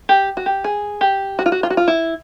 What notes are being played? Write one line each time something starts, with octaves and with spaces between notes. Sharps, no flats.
G4
F#4
G4
G#4
G4
F#4
F4
F#4
F4
F#4
F4
E4